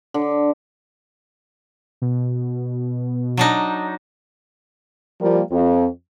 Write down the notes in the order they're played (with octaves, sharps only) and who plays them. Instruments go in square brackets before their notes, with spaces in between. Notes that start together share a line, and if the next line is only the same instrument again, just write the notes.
[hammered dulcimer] D3
[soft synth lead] B2
[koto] F#3 D4 D#4
[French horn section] F3 G3 A#3
F2